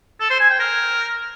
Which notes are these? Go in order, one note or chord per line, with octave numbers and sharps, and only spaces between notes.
A4
C5
G#5
G5
A#4